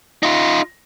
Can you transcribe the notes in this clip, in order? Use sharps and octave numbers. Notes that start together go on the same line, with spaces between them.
D#4 F4